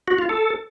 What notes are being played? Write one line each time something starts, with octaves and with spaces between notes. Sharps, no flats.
F#4
F4
A4